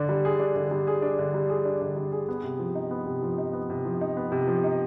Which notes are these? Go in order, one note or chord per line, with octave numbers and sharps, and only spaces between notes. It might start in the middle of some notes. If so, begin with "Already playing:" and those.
Already playing: D3 D4
G3
G#4
D4
D3
G3
G#4
D4
D3
G3
G#4
D4
D3
G3
G#4
B3
C3
F3
D#4
B3
C3
F3
D#4
B3
C3
F3
D#4
B3
C3
F3
D#4